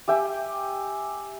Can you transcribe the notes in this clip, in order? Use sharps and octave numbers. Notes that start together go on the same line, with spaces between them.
G4 E5 G5 G#5